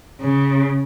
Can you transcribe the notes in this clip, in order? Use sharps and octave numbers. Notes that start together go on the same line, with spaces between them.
C#3